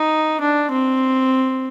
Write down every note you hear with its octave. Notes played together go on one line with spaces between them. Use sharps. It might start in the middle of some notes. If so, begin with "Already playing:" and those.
Already playing: D#4
D4
C4